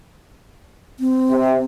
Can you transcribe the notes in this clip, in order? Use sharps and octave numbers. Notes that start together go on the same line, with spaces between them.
C4
C3